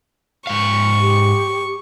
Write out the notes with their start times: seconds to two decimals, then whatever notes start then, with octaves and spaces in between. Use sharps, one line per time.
0.47 G#2 F5 C#6
1.01 G4